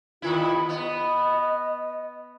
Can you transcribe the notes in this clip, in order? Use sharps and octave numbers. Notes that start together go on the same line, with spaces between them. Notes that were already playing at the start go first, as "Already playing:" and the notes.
D#2 D#3 E4 F4
B3 D#5